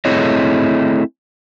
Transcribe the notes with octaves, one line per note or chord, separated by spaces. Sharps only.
A3 C4 E4 G#4 C#5 D#5